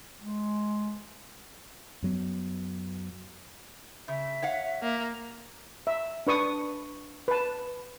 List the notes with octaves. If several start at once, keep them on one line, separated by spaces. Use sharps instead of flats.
G#3
F#2 F#3 B3
C#3 E5
C#5 F5 F#5
A#3
E5
D4 B4 C#6 D#6
B4 A5